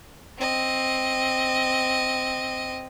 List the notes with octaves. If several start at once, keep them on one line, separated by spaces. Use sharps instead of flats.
C4 D#5